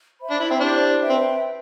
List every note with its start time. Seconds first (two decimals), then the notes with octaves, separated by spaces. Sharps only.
0.20 C5 E5 B5
0.31 D4
0.40 E4
0.51 C4
0.60 D4 E4 G4 C5
1.00 B4 E5 G5
1.09 C4